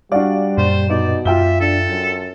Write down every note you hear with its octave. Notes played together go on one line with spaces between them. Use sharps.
G3 D4 F#4 D5 F5
F#2 A#2 C5
B2 D#4 D5
F#2 F4 E5 G5 G7
D4 A4
F#2 A6